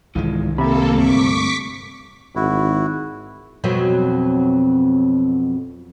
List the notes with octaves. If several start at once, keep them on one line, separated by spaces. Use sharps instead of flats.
C2 G#2 D#3 E3 G#3 F4
C3 A#3 A4 E5 B5
D2 G2 C4 C#6 D6 B6
G#1 E4 F#4
F2 B2 F#3